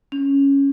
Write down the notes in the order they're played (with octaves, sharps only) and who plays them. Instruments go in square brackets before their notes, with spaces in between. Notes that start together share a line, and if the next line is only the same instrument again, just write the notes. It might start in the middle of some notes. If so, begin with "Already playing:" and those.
[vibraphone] C#4